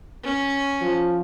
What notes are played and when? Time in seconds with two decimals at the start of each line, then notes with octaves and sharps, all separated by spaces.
0.23 C#4
0.82 F3